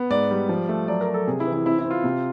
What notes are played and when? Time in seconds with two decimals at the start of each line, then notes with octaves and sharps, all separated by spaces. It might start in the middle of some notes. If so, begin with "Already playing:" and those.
Already playing: B3
0.10 G#2 D5
0.31 G3
0.49 F3
0.69 A3
0.88 F#3 D5
1.01 A#4
1.08 F#3
1.14 A4
1.27 C3 G#4
1.40 E4
1.47 E3
1.53 E4
1.66 C4 E4
1.79 E4
1.85 C4
1.91 F4
2.04 C3